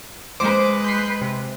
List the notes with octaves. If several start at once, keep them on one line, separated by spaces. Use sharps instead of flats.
G#3 B4 C5 D6
G6 B6 C7
C3